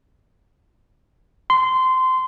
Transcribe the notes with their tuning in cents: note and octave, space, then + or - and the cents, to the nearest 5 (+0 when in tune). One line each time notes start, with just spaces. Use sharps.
C6 -20